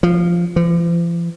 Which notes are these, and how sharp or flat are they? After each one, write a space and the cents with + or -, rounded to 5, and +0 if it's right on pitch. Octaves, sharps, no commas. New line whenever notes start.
F3 -10
F3 -45